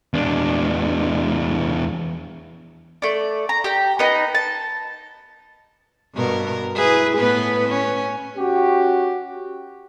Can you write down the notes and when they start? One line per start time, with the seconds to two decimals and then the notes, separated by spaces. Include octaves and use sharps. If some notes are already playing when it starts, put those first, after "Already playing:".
0.14 E2 D4
3.02 A3 D5
3.49 A#5
3.64 G4 A#5
3.99 B3 D#4 A#5
4.35 A5
6.15 G2 B2 A#4
6.75 E4 G#4 B4
7.17 A2 B3 B4
7.69 C#4
8.37 C#4 F#4 G4